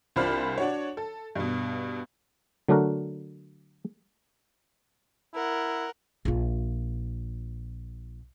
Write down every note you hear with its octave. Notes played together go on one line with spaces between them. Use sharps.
C2 D4 F4 C5 B5 F6
D4 F#4 C#5
A4
G2 B2
D3 F#3 A3 D4 F#4 A#4
E4 A#4 F#5
A#1 F4